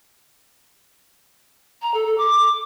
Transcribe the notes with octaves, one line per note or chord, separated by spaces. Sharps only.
A#5
A4
A4
D6